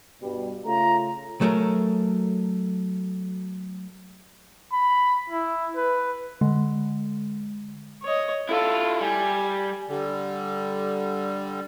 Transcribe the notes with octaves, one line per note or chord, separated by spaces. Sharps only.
G2 B2 G3
C#3 A3 F4 A#5
F#3 A3 G#4 A#4
B5
E4
B4
D3 G#3
C#5 D#5
E4 F4 A4
G3 G#5
D3 G3